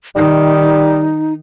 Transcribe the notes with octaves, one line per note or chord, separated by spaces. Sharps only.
D#3 G3 D#4